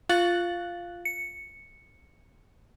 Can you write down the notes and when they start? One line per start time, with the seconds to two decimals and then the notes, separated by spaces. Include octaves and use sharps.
0.09 F4 F5 F#6 A6 F#7
1.05 C#7